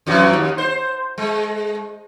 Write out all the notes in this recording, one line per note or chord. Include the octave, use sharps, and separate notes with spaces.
F2 E3 F#3
D#2
C5
G#3